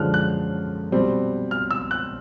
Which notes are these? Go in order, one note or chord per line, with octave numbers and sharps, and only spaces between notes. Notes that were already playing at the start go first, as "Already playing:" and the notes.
Already playing: F#2 D3 F3 G#3 C#4 F6 F#6
F#6
B2 G3 C4
F6
E6
F#6